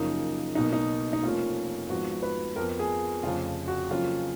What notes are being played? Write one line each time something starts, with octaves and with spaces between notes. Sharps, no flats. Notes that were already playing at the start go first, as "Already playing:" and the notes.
Already playing: F#2 C#3 F3 A#3 D#4
B1 B2 A#3 D#4
D#4
D#4
F1 F2 F3 A#3 C#4 F4
G#1 G#2 F3 B3 F#4
B4
F2 F3 B3 A#4
G#4
F1 F2 C#3 F3 F4
F#4
F2 C#3 F#3 A#3 C#4 F4